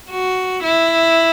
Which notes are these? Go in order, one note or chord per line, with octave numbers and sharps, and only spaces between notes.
F#4
E4